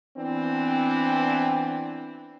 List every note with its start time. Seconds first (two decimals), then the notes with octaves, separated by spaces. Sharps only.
0.17 E3 B3 C4 D4